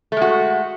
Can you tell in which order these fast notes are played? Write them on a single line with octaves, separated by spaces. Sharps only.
A3 G#3 F#4